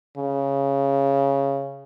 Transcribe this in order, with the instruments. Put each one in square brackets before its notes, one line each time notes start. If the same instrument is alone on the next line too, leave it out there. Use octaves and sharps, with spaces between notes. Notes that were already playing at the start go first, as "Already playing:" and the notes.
[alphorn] C#3